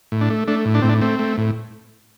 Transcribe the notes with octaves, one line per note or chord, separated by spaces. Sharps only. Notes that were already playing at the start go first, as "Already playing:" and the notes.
A2
D4
A3
A3 D4
A2
D4
A2 C4
D4
A3 C4
A3
A2